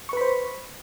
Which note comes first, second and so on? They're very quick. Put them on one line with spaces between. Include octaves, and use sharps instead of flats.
C#6 B4 B5 C5